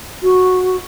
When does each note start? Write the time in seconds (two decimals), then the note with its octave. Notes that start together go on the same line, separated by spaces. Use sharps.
0.22 F#4